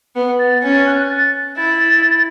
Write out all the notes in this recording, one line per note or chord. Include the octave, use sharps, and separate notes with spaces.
B3
A6
C#4 A6
F#6
A6
E4 A6